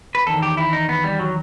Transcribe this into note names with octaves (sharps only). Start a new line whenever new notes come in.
B4
E2 D#3 A4
G4
E4
D#4
B3
G3
F#3